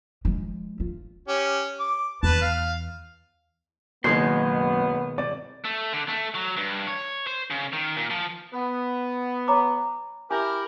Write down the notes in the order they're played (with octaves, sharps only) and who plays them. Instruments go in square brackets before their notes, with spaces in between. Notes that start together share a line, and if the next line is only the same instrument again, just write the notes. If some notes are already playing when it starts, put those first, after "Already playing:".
[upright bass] F3 G#3
F4
[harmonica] C#4 G4
D6
[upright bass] E2 [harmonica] B4 A5
[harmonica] F5
[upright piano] F#1 [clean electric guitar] F#2 G#4 C6 [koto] B2 D#3 G#3 [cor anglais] B3
[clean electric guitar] C2 [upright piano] D5
[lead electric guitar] A3
D3
A3
F#3
G2
C#5
C5
C#3
D#3
A#2
F3
[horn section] B3
[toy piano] C#5 A#5 D6
[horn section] E4 G4 A#4 [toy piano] G#5